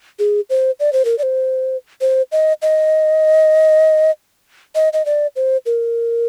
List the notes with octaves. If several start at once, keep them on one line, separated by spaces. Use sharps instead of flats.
G#4
C5
D5
C5
A#4
D5
C5
C5
D#5
D#5
D#5
D#5
D5
C5
A#4